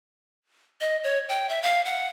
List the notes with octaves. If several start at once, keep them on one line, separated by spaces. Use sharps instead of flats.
D#5
C#5
G5
E5
F5
F#5